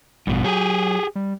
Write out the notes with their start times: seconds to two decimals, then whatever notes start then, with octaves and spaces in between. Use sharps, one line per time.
0.27 A1 G2 B2
0.44 F#3 G4 G#4
1.16 G3